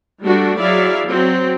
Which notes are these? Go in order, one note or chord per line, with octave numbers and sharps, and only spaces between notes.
G3 A3 D4 F#4
F#3 E4 G#4 D5 E5 F5
F#3 C4